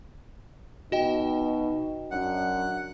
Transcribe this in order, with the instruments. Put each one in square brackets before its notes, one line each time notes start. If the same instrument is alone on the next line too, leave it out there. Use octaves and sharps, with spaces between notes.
[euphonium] B2 [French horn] D#4 [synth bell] F#4 D#5 G5
[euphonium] F#2 [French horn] D4 [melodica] F#5